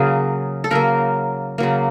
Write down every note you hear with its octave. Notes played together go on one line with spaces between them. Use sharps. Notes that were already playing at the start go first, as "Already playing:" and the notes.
Already playing: C#3 F#3 A#3 G#4
A4
C#3 F#3 A#3 A#4
C#3 F#3 A#3